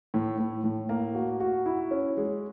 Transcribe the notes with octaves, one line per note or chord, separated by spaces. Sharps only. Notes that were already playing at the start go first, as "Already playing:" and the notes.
A2
A2
A2
A#3
F#4
F#4
E4
C#4
G#3